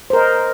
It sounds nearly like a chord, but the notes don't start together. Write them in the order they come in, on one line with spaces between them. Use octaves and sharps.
C5 A#4 D#5